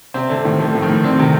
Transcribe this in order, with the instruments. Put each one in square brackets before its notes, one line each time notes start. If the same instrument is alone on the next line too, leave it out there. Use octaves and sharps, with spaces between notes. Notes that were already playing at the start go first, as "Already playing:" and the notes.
[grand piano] C3 [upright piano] C4
[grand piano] D3 [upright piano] A3
[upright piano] A2 [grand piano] D#3
[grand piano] F3 [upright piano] A3
[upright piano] A2
[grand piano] D#3
[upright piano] A2
[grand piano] D3 [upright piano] C4
[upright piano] C3 [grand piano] D#3